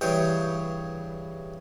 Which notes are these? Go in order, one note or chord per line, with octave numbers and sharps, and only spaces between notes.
G2 C#3 E3 C#5 G5